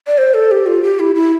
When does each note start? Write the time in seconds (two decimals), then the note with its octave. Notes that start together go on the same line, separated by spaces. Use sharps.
0.07 D5
0.18 C5
0.34 A4
0.51 G4
0.66 F4
0.83 G4
0.99 E4
1.15 E4